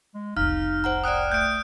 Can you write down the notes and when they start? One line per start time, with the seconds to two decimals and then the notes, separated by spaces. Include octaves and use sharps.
0.15 G#3
0.37 F1 C2 D#4 F5 F6
0.84 C5 F#5 A#5
1.04 D5 G5 D#6 F#6 D7
1.32 A3 G6 D7